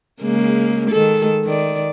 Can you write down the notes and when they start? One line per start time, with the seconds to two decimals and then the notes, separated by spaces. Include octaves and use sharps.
0.22 C#3 G#3 A#3
0.90 D#3 G#3 A4
1.45 D#3 D5